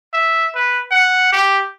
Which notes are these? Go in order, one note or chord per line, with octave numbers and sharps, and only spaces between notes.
E5
B4
F#5
G4